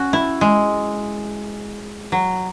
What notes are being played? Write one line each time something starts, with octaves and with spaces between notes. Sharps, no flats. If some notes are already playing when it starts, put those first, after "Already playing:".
Already playing: C#4 F#4
E4
G#3
F#3